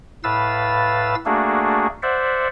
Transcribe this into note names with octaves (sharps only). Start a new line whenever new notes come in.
A2 B4 F5 E6 A6
A3 A#3 D4 F#4 G#4
C5 D5 E5 F#5